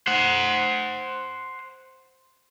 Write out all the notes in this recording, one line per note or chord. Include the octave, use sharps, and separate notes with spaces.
C5 F#5